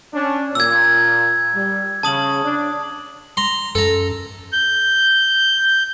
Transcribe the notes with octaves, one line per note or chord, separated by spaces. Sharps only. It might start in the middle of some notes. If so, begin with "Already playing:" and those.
C#4 D4
A#2 E6 G#6
G3
C#3 A5 D#6 F#7
D4
A#5 C6
F#2 A4 A#5
G6